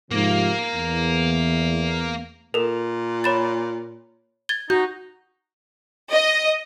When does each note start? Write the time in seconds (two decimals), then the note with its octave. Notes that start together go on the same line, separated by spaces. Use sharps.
0.11 G#2 C3 F3 A#3
0.74 E2
2.54 A#2 A4 A#4
3.24 C#5 B5 A6
4.49 G#6 A6 G7
4.70 D#4 F#4 G6
6.13 D#5